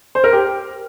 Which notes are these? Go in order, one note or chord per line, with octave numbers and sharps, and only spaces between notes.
C5
A#4
G4